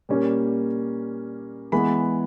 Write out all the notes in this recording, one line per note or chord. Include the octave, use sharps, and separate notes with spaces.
A#2 G3 A#3 C#4
E3 G#3 B3 B5